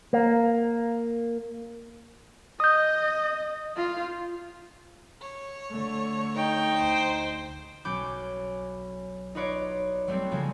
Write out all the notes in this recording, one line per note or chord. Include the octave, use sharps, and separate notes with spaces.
A#3
D#5 D#6 G6
F4
C#5
D3 A3
D#4 G5
D2 C5
B1 F#3 C#4 B5 D6 G6
D#4 F4 B4 C#5 D5
F#3 G3 A3 B3 C4
C#3 F3 A#3 G#4 A4